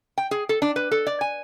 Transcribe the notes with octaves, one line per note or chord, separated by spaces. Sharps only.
G5
G#4
A4
D4
B4
A4
D5
G#5